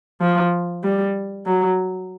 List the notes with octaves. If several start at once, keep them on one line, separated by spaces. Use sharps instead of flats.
F3
G3
F#3